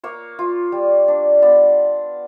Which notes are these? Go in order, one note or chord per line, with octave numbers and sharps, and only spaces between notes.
A#3 C#5
F4
G3
D4
B3 D5